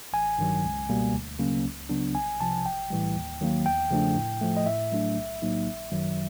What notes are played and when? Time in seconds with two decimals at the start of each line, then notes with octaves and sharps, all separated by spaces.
0.13 A1 G#5
0.38 G2 D#3 F#3
0.65 C#2
0.89 B2 G3 A#3
1.14 D2
1.39 C#3 F#3 A#3 C#4
1.65 C#2
1.89 C#3 F#3 B3 D4
2.14 C2 G#5
2.41 C3 F3 A5
2.65 B1 G5
2.90 A2 E3 G3
3.15 D#2
3.41 D#3 F#3 A#3
3.66 E2 G5
3.91 C#3 F3 A3 D4
4.16 A2
4.41 F3 A3
4.57 D#5
4.66 A2 E5
4.92 F#3 A3 D4
5.16 B1
5.42 A2 F#3 A#3 D#4
5.66 G#1
5.92 F#2 D#3 F#3